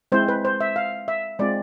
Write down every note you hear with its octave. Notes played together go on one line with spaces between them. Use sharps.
G#3 C4 E4 C5
B4
C5
E5
F5
E5
G#3 C4 F4 D5